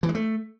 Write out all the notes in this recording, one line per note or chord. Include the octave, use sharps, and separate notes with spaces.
E3
G#3
A3